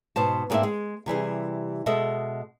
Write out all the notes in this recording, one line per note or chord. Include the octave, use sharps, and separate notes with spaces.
G#2 B2 C5 A5
G#2 F#3 A#3 C4 D4 E5
G#3
C3 E3 G3 G#4
B2 G#3 A4 D#5 E5